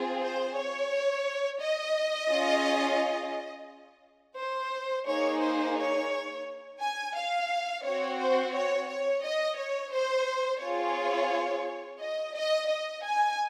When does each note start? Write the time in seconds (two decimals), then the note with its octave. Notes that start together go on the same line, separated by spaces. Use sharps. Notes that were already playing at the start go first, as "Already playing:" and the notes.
Already playing: C4 F4 G#4
0.22 C5
0.56 C#5
1.61 D#5
2.30 C#4 F4 G#4
4.38 C5
5.07 A#3 D#4 G#4 C#5
5.41 C5
5.77 C#5
6.81 G#5
7.15 F5
7.84 C4 F#4 C#5
8.19 C5
8.54 C#5
8.88 C#5
9.23 D#5
9.57 C#5
9.92 C5
10.61 C4 F4 G#4 C#5
12.00 D#5
12.35 D#5
12.69 D#5
13.04 G#5